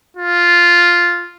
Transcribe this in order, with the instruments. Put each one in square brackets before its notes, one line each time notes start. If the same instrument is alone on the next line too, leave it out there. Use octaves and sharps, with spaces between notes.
[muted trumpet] F4